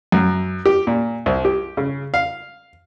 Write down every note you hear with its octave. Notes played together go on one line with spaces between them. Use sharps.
F#2
G4
A#2
C2
G4
C#3
F5